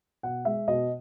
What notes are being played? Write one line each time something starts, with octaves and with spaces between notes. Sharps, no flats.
B2 F#5
G#3 E5
B2 D#5